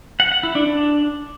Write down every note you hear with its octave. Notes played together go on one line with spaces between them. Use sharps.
F#5
F#5
E4
D4
D4